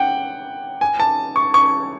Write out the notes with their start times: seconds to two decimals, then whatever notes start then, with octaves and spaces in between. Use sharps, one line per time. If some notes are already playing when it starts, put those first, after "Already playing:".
Already playing: F#5 G5
0.81 G#5
1.00 A5
1.36 C#6
1.54 C#6